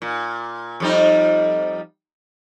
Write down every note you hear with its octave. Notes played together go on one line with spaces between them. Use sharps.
A#2
F2 G3 D#4